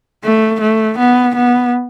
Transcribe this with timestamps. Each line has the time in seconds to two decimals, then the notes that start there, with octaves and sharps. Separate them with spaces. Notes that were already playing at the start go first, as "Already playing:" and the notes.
0.24 A3
0.61 A3
0.99 B3
1.36 B3